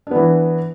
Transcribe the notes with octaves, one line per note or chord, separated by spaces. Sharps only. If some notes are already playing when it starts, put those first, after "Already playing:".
E3 B3 D4